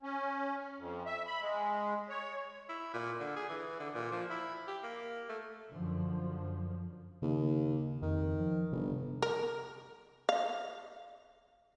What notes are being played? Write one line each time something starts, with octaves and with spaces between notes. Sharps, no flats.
C#4
F2
E5
B5
G#3
C#5
E4
A#2
D3
G#4
E3
D3
A#2
F3
E4
G4
A#3
A3
F#2 D3 F3
D#2 C#3
F2 D#3
F3
G1 C3
A#4
F5